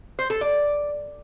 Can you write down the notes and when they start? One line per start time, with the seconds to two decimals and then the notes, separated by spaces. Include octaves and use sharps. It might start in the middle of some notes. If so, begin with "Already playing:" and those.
0.19 C5
0.30 A4
0.41 D5